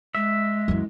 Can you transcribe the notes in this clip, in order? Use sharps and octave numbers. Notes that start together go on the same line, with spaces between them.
G#3 E5
F#2 E3